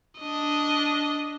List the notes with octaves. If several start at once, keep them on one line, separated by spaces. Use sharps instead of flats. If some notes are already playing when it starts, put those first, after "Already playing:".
D4 D#5